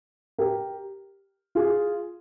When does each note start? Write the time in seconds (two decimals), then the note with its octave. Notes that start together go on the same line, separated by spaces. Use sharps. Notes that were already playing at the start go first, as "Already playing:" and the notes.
0.38 G4 A#4
1.55 F4 G#4